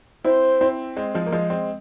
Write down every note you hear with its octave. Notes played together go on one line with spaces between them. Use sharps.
C4 E4 C5
C4 E4
G#3 C4
F3 G#3
A#3
F3 G#3
G#3 C4